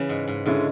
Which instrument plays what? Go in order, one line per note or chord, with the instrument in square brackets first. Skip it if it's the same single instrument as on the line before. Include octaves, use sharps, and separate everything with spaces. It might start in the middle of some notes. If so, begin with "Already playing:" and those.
Already playing: [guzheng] C#3 E3
G#2
G#2
[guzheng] G#2 [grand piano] D3 G#3 C#4 E4